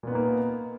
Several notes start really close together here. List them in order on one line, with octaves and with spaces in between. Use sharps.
A#2 B3 D#4 A#3